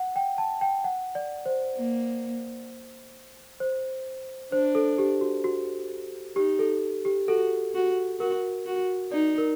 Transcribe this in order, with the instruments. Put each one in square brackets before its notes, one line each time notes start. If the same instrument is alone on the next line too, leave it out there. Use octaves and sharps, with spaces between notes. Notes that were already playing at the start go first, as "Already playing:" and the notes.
Already playing: [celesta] F#5
G5
A5
G5
F#5
D5
C5
[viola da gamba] A#3
[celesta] C5
[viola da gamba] D4 [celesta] C5
[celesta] A4
G4
F#4
F#4
[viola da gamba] D#4 [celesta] G4
[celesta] A4
G4
[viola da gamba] F#4 [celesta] A4
[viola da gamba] F#4
[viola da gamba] F#4 [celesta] A#4
[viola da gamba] F#4
[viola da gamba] D#4 [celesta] D5
[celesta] A#4